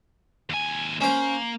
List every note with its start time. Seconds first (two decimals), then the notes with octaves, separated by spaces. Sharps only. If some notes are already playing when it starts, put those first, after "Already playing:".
0.49 D#2 G#5
1.01 A#3 C#4 C5